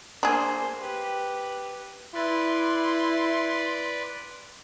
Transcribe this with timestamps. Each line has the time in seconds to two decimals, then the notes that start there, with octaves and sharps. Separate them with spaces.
0.23 A#3 D4 G#4 C5
0.78 G4 B4
2.15 E4 B4 D5 C6